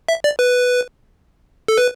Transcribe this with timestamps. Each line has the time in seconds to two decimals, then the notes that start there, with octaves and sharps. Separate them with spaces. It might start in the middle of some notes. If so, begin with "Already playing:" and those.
0.08 E5
0.24 D5
0.39 B4
1.68 A4
1.78 B4